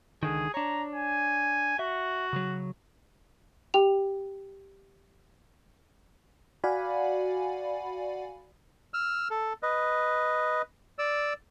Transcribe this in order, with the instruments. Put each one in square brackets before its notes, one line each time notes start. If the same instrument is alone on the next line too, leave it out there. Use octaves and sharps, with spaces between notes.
[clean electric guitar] C#2 D3 D#3 [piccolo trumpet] G#4
[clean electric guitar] D4 C#5 [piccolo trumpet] A#5
[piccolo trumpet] G#5
[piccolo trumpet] F#4 [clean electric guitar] E5
[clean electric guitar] C#3 F#3
[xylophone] G4 G5 F7
[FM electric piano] F#4 D5 F5 F#5 G#5 B5
[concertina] E6 F6
A4
B4 D#5
D5 E6